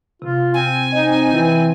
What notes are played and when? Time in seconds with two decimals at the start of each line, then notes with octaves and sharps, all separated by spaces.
0.22 C3 F4
0.54 C4 G#5
0.92 C4 D#4 D#5
1.33 E3 C4